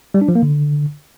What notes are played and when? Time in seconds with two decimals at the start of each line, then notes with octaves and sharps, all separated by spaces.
0.14 G3
0.21 D4
0.28 F3
0.35 A#3
0.42 D3